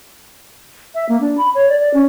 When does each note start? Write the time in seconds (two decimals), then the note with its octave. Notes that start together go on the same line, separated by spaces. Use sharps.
0.95 E5
1.09 A#3
1.21 D4
1.37 B5
1.55 C#5
1.69 D5
1.81 D5
1.94 C#4